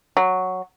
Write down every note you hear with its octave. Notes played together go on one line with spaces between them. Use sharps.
F#3